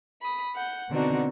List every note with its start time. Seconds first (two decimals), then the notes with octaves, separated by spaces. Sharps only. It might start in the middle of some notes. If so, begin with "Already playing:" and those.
0.21 B5 D#6
0.54 F#5 G6
0.91 B2 D3 C4 D4 D#4 F#4